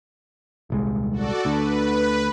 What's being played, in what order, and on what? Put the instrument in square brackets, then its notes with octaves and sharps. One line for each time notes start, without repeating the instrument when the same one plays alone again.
[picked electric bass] D#1 C2 G#3
[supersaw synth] F#4 A4 D5
[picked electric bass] D2 D3 [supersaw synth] B4